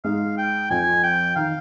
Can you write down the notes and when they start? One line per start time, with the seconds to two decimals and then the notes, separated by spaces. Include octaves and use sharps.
0.04 G#2 G#3 F5
0.38 G5
0.70 F2 F3 G#5
1.04 G5
1.36 D#3 F5